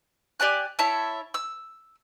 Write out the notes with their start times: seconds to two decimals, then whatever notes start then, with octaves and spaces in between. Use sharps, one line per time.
0.40 G4 D5 G#5 F#6
0.79 E4 C#5 E5 A5
1.34 E6